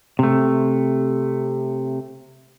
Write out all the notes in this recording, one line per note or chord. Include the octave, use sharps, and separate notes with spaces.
C3 A3